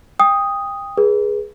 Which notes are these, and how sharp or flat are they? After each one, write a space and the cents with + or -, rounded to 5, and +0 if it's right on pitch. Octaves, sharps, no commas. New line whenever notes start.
G5 +25 D#6 +0
G#4 +0 B4 -25